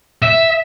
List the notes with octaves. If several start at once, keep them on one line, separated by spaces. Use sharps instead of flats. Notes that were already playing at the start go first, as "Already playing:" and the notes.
E5